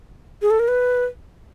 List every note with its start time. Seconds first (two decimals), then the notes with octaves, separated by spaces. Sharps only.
0.42 G#4
0.50 A4
0.59 A#4
0.68 B4